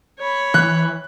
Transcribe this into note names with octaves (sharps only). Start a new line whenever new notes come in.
C#5 B5
E3 F#6